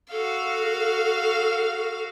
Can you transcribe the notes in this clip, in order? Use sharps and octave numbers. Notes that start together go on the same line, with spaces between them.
F#4 A4 F5